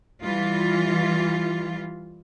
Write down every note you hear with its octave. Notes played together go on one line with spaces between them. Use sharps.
E3 G3 F4